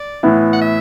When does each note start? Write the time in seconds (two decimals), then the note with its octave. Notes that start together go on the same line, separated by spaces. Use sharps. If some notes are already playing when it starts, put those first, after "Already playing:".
Already playing: D5
0.23 A2 E3 B3 E4
0.53 F#5
0.61 E5